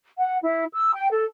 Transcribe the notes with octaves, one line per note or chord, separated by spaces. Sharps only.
F#5
E4
E6
G5
A4